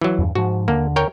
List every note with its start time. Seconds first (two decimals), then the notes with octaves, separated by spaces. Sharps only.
0.01 E3 F#3
0.19 E2 G2
0.35 G#2 F3 F#4
0.68 D#2 D3 A#3
0.96 A#4 C#5 G5